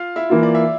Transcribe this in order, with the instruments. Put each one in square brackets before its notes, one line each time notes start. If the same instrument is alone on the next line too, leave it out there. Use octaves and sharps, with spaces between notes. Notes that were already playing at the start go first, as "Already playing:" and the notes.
Already playing: [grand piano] F4 F5
E4 E5
[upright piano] E3 A#3 F4
[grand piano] D5
E5